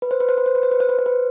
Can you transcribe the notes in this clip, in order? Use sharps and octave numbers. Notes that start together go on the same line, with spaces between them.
B4
C5
B4
C5
B4
C5
B4
C5
B4
C5
B4
C5
B4